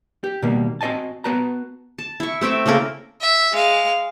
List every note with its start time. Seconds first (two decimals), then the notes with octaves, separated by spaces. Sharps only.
0.24 G4
0.42 B2 D#3 G3 A#3
0.81 C4 F#4 D#5 G#5 A5
1.24 B3 F#4 B4 A5 A#5
1.98 A5
2.20 E4 C#6
2.41 A3 C4 E5 G5
2.66 C#3 A#3 A4 A#4
3.21 E5
3.52 G#3 F5